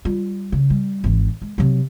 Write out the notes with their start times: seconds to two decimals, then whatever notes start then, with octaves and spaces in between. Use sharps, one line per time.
0.05 G3 F4
0.52 C#3
0.70 G3
1.04 G#1 E3
1.42 G#3
1.58 C3 F#3